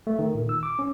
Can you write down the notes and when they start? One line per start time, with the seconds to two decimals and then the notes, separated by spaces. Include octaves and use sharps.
0.07 A3
0.19 D#3
0.35 A#2
0.49 E6
0.63 D6
0.79 C#4